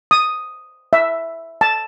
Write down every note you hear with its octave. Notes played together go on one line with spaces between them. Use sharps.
D#6
E5
A5